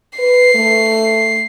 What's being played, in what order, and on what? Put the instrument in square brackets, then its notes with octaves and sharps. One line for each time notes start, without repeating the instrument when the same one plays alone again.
[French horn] B4 [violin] C7
[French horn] A3